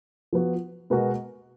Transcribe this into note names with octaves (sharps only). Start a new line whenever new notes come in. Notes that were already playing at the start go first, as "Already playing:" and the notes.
F3 B3 F#4
B2 G#3 B3 F#4 A#4